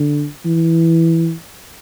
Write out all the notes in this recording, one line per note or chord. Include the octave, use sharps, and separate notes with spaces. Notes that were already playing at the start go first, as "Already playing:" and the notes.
Already playing: D3
E3